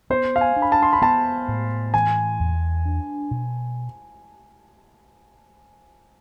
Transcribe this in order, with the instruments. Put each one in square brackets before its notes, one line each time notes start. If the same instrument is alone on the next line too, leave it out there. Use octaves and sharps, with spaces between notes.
[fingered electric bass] B3 [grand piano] C5
[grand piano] F5
G#5
[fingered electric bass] D4
[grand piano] B5
A5
C6
B5
[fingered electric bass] B3 [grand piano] A5
[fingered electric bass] A2
[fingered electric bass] E3 [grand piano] G#5
[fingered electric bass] E2
D4
B2